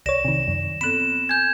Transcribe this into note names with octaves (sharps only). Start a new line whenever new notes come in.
C2 C#5 D5 A#6 E7
C3 D#3
F#2
B3 C4 A4 B5 F#6 E7
G#5 G6 G#6